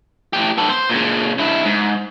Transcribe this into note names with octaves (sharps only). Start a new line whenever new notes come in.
A2 G4
B3 A4
C5
A#2 C#3
G2 E4
G#2